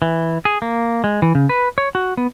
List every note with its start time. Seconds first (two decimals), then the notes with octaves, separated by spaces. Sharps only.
0.02 E3
0.45 G#4
0.62 A#3
1.04 G#3
1.22 E3
1.35 C#3
1.49 B4
1.78 C#5
1.95 F#4
2.17 B3